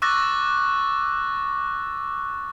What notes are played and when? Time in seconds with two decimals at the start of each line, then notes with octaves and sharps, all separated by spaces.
0.02 C#6 D6 E6 F#6 A6 A#6